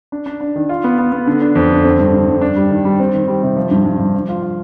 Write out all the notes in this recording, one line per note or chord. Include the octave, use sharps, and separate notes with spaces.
D4
D4
D4
D#3
F4
B3
B3
B3
D3
D4
F2
D3
C4
G2
G2
G2
D4
G3
D#3
G3
C4
D#3
G3
C3
F3
G2
G2
G2
F3
F4
F4